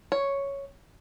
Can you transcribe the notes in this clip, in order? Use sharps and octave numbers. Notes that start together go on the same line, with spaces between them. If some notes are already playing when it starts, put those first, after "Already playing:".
C#5